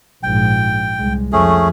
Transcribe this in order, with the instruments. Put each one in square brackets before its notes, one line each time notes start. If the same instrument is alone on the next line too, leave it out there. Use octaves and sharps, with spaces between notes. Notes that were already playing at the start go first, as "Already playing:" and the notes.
[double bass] A#1 G#2 [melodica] G5
[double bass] C2 G#3
[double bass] F2 [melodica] A3 C#4 G#4